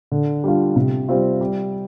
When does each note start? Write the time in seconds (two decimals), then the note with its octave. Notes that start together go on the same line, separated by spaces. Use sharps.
0.12 D3
0.44 G3 D4 F4
0.76 C3
1.08 G3 C4 F4
1.41 G3